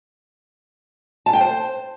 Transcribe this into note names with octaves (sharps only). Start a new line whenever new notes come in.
A5
G5
C5